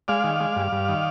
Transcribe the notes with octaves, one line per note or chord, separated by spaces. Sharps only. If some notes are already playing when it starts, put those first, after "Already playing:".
G#3 D5 F5
D#3
G#3
G2
G2
D#3